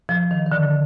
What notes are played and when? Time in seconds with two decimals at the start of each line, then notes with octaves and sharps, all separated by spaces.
0.09 F3
0.31 D#3
0.46 D#3
0.52 D3